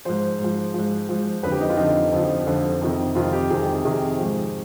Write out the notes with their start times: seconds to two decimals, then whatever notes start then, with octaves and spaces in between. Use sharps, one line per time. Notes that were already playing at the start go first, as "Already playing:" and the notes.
0.05 G#2 F3 C5
0.40 G#2 F3
0.74 G#2 F3
1.09 G#2 F3
1.43 F2 D3 F3 B4
1.52 G4
1.61 D#4
1.69 F4
1.77 F2 D3 F3 D#4
2.12 F2 D3 F3
2.47 F2 D3 F3
2.81 F2 C3 D#3
3.15 F2 C3 D#3 F4
3.33 G4
3.50 F2 C3 D#3 G#4
3.85 F2 C3 D#3 G#4
4.19 G#2 F3